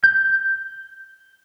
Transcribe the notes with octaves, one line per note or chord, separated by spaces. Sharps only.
G6